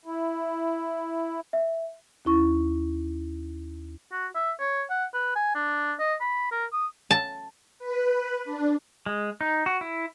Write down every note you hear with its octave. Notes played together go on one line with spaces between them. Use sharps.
E4
E5
D#2 C#4 E4 C#6
F#4
E5
C#5
F#5
B4
G#5
D4
D#5
B5
A#4
D#6
A5
B4
D4
G#3
D#4
F#4
E4